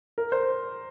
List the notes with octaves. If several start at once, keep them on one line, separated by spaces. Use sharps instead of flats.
A#4
C5